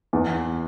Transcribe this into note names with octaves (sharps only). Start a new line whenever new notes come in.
E2